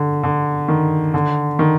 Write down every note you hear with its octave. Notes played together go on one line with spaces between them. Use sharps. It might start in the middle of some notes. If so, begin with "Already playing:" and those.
Already playing: D3
D3
D#3
D3
D#3